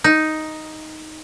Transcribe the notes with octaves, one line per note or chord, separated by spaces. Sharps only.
D#4